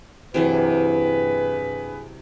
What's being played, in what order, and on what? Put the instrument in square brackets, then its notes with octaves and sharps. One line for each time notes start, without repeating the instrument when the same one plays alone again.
[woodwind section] G2 G#4 B4 [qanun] C3 E3 F#3